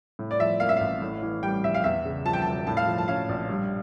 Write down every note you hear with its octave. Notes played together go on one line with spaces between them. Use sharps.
A2
D5
F3 E5
A#3 F5
E5
A1 F5
A2
E3
G3 G5
A#1 E5
F5
E2 E5
C#3
F3 A5
G5
E1 A5
A2 A5
F5
F3
A5
C#4 F5
A#1
G2